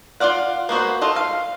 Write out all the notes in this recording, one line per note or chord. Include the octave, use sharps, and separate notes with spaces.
F4 F#4 D5 F5 F#5
A#3 B3 F#4 C5
F4 A4 D#5
F5